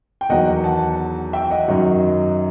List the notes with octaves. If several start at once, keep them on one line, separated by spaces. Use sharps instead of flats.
G5
E2 D#3 F#3 D#5 F#5
F#5 A5
E5 G5
D#5 F#5
F#2 D#3 F#3